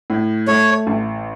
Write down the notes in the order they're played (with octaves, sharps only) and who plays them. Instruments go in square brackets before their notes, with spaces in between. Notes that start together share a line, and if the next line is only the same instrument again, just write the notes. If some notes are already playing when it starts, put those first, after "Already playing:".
[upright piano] A2
[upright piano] A3 [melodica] C#5
[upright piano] A1